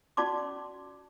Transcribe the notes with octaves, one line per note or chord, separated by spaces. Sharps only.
C#4 F#4 D5 A5 C6 D6